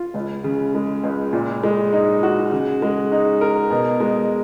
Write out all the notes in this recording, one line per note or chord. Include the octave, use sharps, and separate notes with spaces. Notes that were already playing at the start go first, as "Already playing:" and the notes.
Already playing: F4
C#2
C#3
G#3
C#2
A#2
G#3
D#4
F#4
C#3
G#3
D#4
A#4
B2
G#3